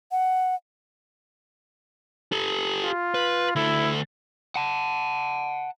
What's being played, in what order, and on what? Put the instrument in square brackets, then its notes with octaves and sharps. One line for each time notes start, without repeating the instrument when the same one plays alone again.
[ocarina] F#5
[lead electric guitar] G4 A4
[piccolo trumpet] F4
[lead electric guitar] B4
[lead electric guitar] D2 A4 [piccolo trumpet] E4
[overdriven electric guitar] F#5 A5